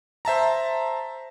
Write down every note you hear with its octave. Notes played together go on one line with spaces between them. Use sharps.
C5 E5 A5 A#5